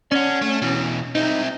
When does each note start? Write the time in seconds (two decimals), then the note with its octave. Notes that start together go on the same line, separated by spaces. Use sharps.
0.12 C#4 D5 F#5
0.42 A3
0.62 B2 E3
1.15 C4 D#4 E4